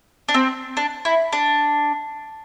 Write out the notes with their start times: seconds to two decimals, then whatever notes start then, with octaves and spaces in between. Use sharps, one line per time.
0.28 D4
0.34 C4
0.77 D4
1.05 E4
1.33 D4